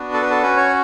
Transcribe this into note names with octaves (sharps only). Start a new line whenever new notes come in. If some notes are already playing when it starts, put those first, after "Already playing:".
Already playing: B3 D4 F#4
A4
B4
A4
C#4 F#4 B4
C#5